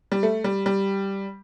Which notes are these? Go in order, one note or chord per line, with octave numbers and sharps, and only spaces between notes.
G3
A3
G3
G3